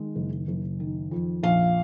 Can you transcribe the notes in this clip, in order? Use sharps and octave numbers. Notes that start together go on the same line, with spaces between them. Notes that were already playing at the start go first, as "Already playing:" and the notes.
Already playing: D#3 G#3
F#1
F#1
D#3
F2
A#1 F5